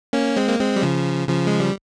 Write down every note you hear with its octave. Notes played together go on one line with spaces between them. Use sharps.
A#3 C#4
G#3 C4
A#3
G#3 C4
G3
C#3 F3
C#3 F3
G#3
G3